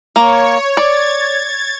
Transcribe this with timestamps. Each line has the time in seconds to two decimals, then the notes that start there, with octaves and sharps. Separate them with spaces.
0.16 A#3 C#5
0.77 D5 G#6 A6